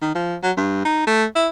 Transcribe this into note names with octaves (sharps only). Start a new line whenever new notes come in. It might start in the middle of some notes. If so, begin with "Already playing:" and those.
D#3
F3
F#3
G2
D#4
A3
E4